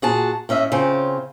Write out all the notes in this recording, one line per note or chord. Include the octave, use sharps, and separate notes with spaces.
A#2 F#4 G#4 F#5 A5
A2 C#4 D#5 E5
C#3 C4 C#4 F4